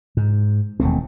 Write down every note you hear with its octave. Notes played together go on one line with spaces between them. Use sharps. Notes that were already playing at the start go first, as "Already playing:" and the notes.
G#2
E1 D#2 A3 C4